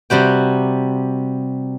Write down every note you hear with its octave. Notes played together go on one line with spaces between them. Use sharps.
C3 G3 F#4 G5